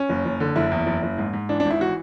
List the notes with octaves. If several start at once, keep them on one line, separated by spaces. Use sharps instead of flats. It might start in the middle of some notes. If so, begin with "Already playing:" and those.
Already playing: C#4
F#1
F#1
D3
F#1 E4
E2
F#1
F#1
G#2
G#2
E3 D4
D4
G#1
E4
E3 F#4